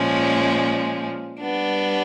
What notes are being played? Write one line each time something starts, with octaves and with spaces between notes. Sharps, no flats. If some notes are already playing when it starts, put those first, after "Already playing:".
Already playing: A#2 F3 G#3 C#4
G3 B3 D4